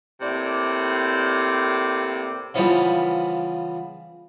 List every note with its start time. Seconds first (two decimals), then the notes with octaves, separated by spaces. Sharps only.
0.21 A2 C3 A#3 D5
2.54 C#3 E3 F3 G3 B3